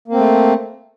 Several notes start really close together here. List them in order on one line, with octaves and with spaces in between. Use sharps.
A#3 C4 A3